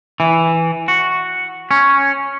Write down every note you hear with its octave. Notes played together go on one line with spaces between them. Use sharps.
E3
F#4
C#4